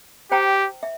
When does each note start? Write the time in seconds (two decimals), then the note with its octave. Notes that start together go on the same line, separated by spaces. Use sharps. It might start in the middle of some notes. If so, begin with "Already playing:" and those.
0.31 G4 C5 G5 A#5
0.83 E5